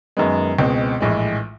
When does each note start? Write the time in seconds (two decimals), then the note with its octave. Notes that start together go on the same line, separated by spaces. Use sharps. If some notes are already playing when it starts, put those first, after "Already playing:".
0.17 F#2 D#3 G#3 B3
0.59 C#2 B2 G#3 C4
1.00 A#1 A2 E3 G#3